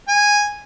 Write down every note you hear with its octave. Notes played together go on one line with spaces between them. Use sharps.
G#5